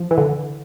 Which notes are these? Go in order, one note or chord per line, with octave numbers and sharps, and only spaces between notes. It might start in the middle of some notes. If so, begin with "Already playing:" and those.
Already playing: F3
E3
D3